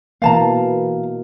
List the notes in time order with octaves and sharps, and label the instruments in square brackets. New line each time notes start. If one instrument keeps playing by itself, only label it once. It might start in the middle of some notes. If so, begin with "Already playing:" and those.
[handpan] B2 E3 A#3 [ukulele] F5 A5 A#5